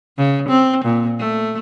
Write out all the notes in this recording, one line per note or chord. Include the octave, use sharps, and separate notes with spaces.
C#3
C4
A#2
A3